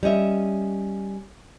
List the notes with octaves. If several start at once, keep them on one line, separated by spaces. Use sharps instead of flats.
G3 C#4 D#5 E5